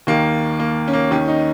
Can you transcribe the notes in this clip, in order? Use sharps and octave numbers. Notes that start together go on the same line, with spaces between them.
D#2 D#3 A#3
A#3
C#4
A#3
D#2 D#3 C#4
D#4